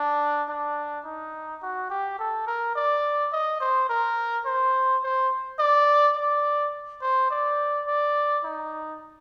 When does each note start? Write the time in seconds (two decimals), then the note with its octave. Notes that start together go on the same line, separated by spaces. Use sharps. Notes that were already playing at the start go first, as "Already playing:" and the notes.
Already playing: D4
0.49 D4
1.05 D#4
1.62 F#4
1.90 G4
2.19 A4
2.47 A#4
2.76 D5
3.33 D#5
3.60 C5
3.89 A#4
4.46 C5
5.03 C5
5.59 D5
6.16 D5
7.02 C5
7.30 D5
7.86 D5
8.44 D#4